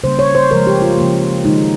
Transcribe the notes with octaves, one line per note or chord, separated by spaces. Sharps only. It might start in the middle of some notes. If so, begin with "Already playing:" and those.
C#3 G3 A#3 C5
C#5
C5
C#3 F3 G#3 A#4
G4
F4
C#3 F3 A#3
D#3 G#3 D#4